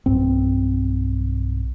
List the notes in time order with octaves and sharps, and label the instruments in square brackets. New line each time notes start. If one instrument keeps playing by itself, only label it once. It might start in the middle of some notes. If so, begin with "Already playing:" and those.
[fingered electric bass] B1 G2 C4